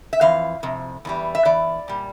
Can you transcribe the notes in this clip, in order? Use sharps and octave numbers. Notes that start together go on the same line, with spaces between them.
E5
F2 E3 F5
F2 C3
E2 E3 G3
E5
E2 E3 D5
A#2 G3